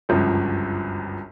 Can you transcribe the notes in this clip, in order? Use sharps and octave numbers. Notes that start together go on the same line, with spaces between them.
G1 C#2 F#2 F3